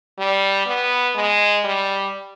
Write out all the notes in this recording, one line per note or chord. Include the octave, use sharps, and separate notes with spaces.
G3
B3
G#3
G3